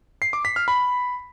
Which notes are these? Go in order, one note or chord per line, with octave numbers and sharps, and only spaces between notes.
C7
D6
B6
F6
B5